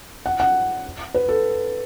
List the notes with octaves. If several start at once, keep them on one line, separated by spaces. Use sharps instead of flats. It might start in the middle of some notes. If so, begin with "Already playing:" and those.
F#5
F#5
B4
A4